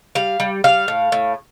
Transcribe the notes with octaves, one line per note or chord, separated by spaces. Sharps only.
G3 F5
G3
G3 F5
A2
A2